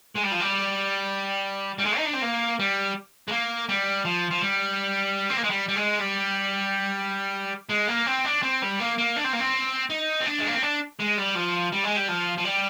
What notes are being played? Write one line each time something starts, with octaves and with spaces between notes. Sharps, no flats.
G#3
G3
F3
G3
G3
G#3
D#4
D4
C4
A#3
G3
G#3
A#3
G3
F3
F3
G3
C4
A#3
G#3
G3
G3
G#3
G3
G#3
A#3
C4
D4
C4
G3
A#3
A#3
D4
C4
A#3
C4
D#4
C4
D4
G#3
A#3
C4
D4
G#3
G3
F3
G3
G#3
G3
F3
F3
G3